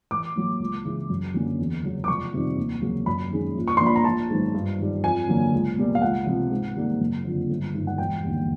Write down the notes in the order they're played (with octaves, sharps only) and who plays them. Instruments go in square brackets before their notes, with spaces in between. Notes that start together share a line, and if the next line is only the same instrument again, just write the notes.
[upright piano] A1 D6
A2 F#3 A#3
C#2
C#3 E3 G#3
F#2
D3 F#3 A#3 C#4
E2
C#3 F#3
D6
F1 C#6
F2 C3 D#3 G3
D#2
C#3 F#3 A#3
F#2 B5
D#3 G#3 C#4
A#1
C#6
A#2 F3 A#3 D4 C6
B5
A#5
A#1 A5
G#2 D#3 F#3 B3
G2
D#3 G3
F2 G#5
D3 F#3 A#3
C#2
B2 G3 A#3
F5
C#2 F#5
C3 F3
G#2
D#3 G3 A#3
F#1
F2 D3
G1
G2 D#3
F#5
E1 G5
D#2 D3 G3